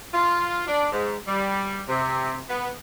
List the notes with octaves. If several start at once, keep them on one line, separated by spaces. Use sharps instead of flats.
F4
D4
G#2
G3
C3
B3